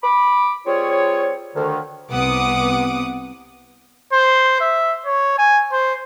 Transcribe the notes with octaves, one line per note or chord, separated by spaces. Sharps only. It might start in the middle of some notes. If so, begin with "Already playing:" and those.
B5 D6
G3 C4 F4 G#4 C#5
D2 D3 D#3
C2 C3 B3 F#5 D6 D#6
C5
E5
C#5
G#5
C5